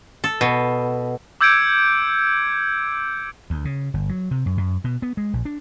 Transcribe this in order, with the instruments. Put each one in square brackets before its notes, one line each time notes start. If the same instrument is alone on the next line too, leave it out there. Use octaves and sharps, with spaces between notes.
[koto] A4
B2
[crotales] D6 E6 G6 G#6 C#7 D7
[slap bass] D2
C#3
G1
F#3
C3
F#2
F#2
B2
B3
G#3
A#1
D4